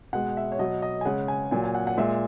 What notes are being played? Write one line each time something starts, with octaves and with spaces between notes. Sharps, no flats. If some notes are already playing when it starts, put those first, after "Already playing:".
B2 G#3 F#5
E5
C#5
B2 F#3 D#5
D#5
G#5
C#3 G#3 F#5
G#5
A#2 F#3 G#5
G#5
F#5
F#5
A#2 G#3 E5